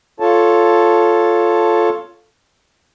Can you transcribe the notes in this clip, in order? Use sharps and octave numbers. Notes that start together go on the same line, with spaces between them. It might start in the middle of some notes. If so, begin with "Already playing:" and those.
F4 A4 C#5 A5